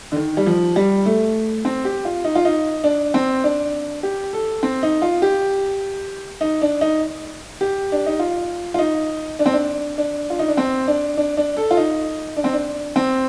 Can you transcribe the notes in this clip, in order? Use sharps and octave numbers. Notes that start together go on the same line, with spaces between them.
D3
D#3
G3
F3
G3
A3
C4
G4
F4
D#4
F4
D#4
D4
C4
D4
G4
A4
C4
D#4
F4
G4
D#4
D4
D#4
G4
D4
D#4
F4
F4
D#4
D4
C4
D4
D4
F4
D#4
D4
C4
D4
D4
D4
A4
F4
D#4
D4
C4
D4
C4